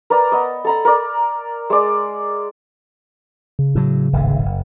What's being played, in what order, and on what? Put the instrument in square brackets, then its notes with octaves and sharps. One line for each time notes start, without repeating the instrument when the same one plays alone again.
[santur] A#4 B4 D5 A#5
B3 D#5
A4 A#5 B5
A#4 D5
G#3 D5
[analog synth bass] C#3
[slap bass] A2 F#3
D1 G#1 D3
F#1